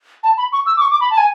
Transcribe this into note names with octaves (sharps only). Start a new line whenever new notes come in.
A5
B5
C#6
E6
D6
C#6
D6
B5
A5
G#5